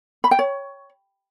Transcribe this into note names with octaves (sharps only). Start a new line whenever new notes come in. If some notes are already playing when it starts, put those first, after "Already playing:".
B5
G5
C#5